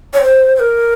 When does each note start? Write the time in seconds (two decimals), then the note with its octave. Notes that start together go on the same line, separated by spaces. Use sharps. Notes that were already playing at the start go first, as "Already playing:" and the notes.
0.14 C#5
0.22 C5
0.56 C5
0.60 A#4